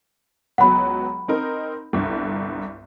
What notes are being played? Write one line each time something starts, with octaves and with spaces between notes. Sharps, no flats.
C#2 F#3 B3 F#5 B5
C4 D#4 A#4
G1 C2 G2